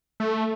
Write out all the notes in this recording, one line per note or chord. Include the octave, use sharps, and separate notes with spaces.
A3